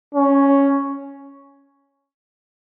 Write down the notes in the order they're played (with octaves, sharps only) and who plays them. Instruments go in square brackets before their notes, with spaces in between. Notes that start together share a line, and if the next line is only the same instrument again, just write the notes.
[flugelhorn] C#4